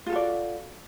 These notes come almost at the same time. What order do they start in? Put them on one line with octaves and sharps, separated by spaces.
F4 A4 F#4 D5